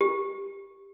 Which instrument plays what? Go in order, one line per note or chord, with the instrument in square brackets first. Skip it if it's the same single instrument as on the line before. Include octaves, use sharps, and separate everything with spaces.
[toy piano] G4